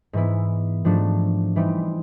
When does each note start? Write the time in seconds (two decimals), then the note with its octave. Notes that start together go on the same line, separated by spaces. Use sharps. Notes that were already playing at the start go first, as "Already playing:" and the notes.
0.13 G#2 E3 G#3 B3 E4
0.85 G#2 F3 A3 D4 F#4
1.56 E3 G3 C4 D#4